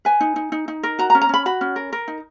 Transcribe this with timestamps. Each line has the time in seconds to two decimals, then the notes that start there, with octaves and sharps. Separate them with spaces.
0.05 B4 G#5
0.21 D#4
0.36 D#4
0.52 D#4
0.68 D#4
0.83 A#4
0.99 F#4 A#5
1.10 A#5
1.15 C#4
1.21 A#5
1.29 C#4 B5
1.46 F#4 B5
1.61 C#4
1.76 A#4
1.93 A#4
2.08 D#4